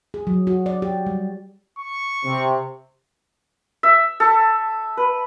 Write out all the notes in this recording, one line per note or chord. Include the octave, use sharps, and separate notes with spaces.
G#4
F#3
F#4
D5
G4
G3
C#6
C3
E5
A4
B4